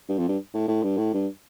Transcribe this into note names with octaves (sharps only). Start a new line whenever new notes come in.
G2
F2
G2
A2
A2
G2
A2
G2